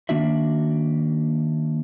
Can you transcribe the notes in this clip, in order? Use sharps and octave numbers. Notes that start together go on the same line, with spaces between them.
D#3 A#3 D4 F#4 E5